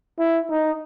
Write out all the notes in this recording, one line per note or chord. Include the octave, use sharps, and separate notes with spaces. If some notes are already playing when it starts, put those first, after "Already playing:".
E4
D#4